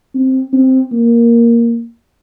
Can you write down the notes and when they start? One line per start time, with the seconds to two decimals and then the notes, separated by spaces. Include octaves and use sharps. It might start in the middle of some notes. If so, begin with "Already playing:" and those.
0.15 C4
0.53 C4
0.92 A#3